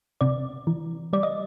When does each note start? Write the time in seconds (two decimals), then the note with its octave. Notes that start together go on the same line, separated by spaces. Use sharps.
0.21 C3 D5
0.67 E3
1.13 G3 D5
1.23 D#5